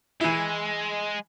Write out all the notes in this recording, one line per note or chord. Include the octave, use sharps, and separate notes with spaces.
E3 G#3 E4